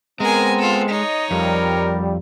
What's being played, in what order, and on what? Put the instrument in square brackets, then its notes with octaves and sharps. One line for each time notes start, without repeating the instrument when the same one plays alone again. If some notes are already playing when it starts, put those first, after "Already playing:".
[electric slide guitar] G#3 [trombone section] B3 C4 [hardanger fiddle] A#4 G#5 [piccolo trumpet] A#5
[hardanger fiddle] F4 A4
[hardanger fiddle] D#4 C#5 [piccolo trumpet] D#5
[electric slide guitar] F2 [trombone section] G3 [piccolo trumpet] A#4